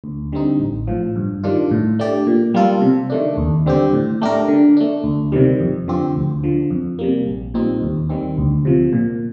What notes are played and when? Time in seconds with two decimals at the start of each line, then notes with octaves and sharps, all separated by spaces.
0.04 D2
0.32 D3 G3 C4 D#4
0.60 A1
0.87 A2 F3
1.16 G2
1.44 D#3 G3 D4 F4
1.71 A2
1.99 A3 D4 G4 D5
2.27 A#2
2.54 G3 A#3 F4 A4
2.81 C3
3.10 D#3 A3 D4
3.37 D#2
3.66 D3 G3 C4 G4
3.93 A2
4.22 A3 D4 G4 A#4
4.48 D3
4.77 A3 D4
5.04 D2
5.32 C3 D#3 G3
5.60 F2
5.88 D3 F3 C4 G4
6.16 D2
6.44 D3 F3
6.70 F2
6.99 C3 G3 A#3
7.27 A#1
7.54 A#2 G3 C4 D#4
7.82 D#2
8.09 D#3 G3 C4
8.38 D2
8.65 C3 F3
8.93 A#2